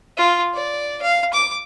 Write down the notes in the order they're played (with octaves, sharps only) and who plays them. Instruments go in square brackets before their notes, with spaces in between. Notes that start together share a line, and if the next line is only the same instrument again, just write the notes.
[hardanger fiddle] F4
D5
F5
D6